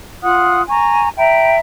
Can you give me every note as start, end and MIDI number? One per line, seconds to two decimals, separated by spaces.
0.22 0.62 65
0.22 0.62 78
0.22 0.62 87
0.22 0.62 90
0.68 1.08 80
0.68 1.08 82
0.68 1.08 85
1.17 1.57 76
1.17 1.57 79
1.17 1.57 82
1.17 1.57 83